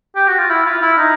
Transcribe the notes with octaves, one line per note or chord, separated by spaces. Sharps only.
G4
F#4
F4
E4
F4
E4
D#4